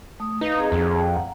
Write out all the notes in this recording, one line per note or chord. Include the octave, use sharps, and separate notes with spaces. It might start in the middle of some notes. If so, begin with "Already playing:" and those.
A3 D#6
D#4 B4 F5
C4 G#4
F2
F#5 A#5